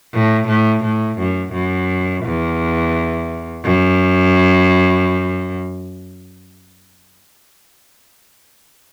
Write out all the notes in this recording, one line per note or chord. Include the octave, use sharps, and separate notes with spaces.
A2
A2
A2
F#2
F#2
E2
F#2